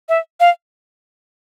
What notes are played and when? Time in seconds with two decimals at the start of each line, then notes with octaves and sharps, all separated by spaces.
0.09 E5
0.40 F5